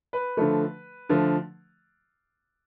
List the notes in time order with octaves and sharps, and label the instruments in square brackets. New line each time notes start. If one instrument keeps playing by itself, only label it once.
[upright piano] B4
D3 F3 A3
D3 F3 A3